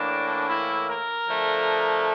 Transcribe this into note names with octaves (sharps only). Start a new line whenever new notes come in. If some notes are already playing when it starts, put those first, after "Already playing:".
Already playing: A2 E3 A#3 D4
E4
A#4
D3 F3 A3